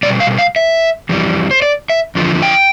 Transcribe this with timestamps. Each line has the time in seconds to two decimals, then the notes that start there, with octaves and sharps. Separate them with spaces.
0.03 B2 G3 D5
0.20 F5
0.38 F5
0.56 E5
1.09 F2 E3 G3
1.51 C5
1.62 D5
1.90 E5
2.15 E2 D3 F3
2.42 G5